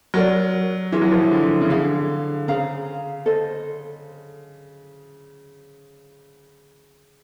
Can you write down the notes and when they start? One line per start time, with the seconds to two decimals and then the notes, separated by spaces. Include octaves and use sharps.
0.14 F#3 F#4 A#4 D5
0.92 E3 F4 G#4 C#5 E5
1.02 F#3
1.12 F3
1.22 E3
1.32 D3
1.61 C#3
1.70 D3 G#4 C#5 F5
2.48 C#3 G#4 C5 F5 A#5
3.26 A4 C5 D#5